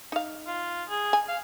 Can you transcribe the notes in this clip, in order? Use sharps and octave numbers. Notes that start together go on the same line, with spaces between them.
D#4 F5
F4
G#4
G#5
F5